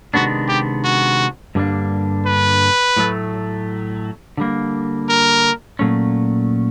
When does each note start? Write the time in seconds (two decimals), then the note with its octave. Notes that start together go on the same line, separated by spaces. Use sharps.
0.14 C3 D#3 G#3 B3 D4 F#4
0.49 G4
0.84 F#4
1.55 G2 D3 G3 A#3 D4
2.26 B4
2.97 A2 F#3 A3
4.37 D3 G3 A#3
5.09 A#4
5.79 A#2 F#3 A3 C#4